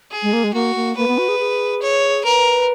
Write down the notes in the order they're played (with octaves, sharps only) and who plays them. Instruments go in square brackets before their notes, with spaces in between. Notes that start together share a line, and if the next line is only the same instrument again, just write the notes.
[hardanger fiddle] G#4
[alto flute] G#3
A#3
G#3
[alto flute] A#3 [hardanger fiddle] F#4
[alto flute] A#3
[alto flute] A#3 [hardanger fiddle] B4
[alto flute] B3
F#4
G#4
G#4
[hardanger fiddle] C#5
[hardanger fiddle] A#4 [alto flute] B4